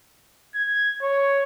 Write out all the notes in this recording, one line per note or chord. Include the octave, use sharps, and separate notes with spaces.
G#6
C#5